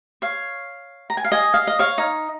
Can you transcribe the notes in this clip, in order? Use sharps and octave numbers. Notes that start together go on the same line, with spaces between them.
C#5 F5
A#5
G#5
F5
D#5 G#5
F5
D#5
C#5 F5
D#4